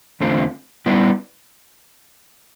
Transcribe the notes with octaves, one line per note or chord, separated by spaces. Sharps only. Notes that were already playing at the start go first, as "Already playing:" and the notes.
E2 D3 A3 C4 F4
G3 B3 E4 B4 D5